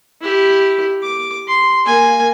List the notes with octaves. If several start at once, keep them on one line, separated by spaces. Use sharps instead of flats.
E4 G4
D6
C6
A#3 G#5